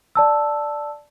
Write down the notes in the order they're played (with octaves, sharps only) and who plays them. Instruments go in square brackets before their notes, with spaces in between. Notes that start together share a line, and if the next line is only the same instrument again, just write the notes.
[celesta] D5 A5 E6